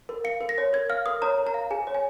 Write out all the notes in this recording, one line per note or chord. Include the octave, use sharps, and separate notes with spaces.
A#4
F5 C#7
A#4
A#6
C#5
A#4 G#6
F5 F6
A#4 D#6
C#5 A#5
A#4
A#5
F5
G#4 G#5
C#5
G#5